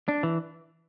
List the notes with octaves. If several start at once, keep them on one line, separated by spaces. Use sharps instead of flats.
D4
E3